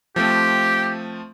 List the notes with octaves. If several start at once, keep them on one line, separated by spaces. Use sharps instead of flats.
F3 A3 C4 G4